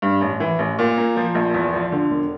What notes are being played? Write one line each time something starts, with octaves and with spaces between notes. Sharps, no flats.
G2
A1
E3
A1
A#2
A#3
F3
A#1
E2
F3
D3
E1